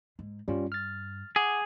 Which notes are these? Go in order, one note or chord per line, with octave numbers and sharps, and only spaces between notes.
G#2
G2 G3 C#4 F4
F6 A6
G#4 F#5 D6